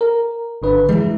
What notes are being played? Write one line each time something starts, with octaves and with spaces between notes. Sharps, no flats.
A#4
G#1 D3 B4
E3 F#3 G#3